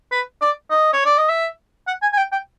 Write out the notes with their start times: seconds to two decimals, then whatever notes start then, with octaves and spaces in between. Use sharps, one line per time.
0.12 B4
0.41 D5
0.70 D#5
0.93 C#5
1.05 D5
1.17 D#5
1.29 E5
1.87 F#5
2.02 G#5
2.13 G#5
2.17 G5
2.32 G5